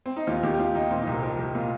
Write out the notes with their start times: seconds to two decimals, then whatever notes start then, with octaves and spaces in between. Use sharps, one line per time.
0.06 C4
0.17 D#4
0.27 D#2 F4
0.43 D#2 G4
0.53 G4
0.59 D#2 F4
0.75 D#3 D#4
0.91 A#2 C4
1.02 D#4
1.07 C2 A#4
1.23 F3 A#4
1.39 C2 G4
1.55 A#2 F4